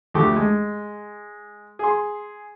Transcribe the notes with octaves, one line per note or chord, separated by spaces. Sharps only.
D2 D3 F3 A3 G4 C#6
G#3
G#4 C6